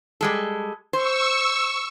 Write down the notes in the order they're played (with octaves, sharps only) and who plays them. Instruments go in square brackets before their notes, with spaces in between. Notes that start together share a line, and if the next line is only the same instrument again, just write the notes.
[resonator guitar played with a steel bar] G3 G#3 A4
[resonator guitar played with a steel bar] C5 [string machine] C#6 E6